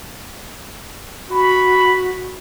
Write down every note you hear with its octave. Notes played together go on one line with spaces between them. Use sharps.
F#4 B5